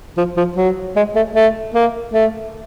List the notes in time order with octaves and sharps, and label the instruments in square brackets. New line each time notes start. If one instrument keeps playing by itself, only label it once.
[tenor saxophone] F3
F3
F#3
G#3
A3
A3
A#3
A3